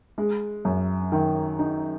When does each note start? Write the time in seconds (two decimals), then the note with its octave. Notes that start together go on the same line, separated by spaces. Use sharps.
0.18 G#3
0.65 F#2
1.12 D#3
1.59 D#4